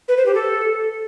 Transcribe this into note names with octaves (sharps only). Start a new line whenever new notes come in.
B4
C5
G4
A4